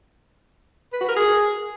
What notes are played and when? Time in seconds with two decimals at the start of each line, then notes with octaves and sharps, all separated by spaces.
0.93 B4
1.01 F#4
1.08 A#4
1.16 G#4